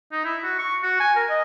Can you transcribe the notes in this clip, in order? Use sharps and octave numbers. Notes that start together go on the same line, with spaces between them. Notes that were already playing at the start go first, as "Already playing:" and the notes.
D#4
E4
F#4
C#6
F#4
G#5
A#4
D#5